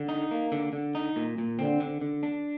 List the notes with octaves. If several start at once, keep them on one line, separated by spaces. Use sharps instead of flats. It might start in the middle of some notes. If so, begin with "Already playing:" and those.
Already playing: D3
D#4
A#3
D3
D3
D#4
A#2
A#2
D3 C4
D3
D3
D4